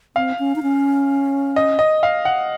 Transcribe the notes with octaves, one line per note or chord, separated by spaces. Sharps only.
C4 F5
C#4
D#4
C#4
D#5
D#5
F5
F#5